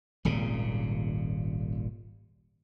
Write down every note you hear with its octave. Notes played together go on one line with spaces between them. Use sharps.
D#1 G#1 A#2 C#3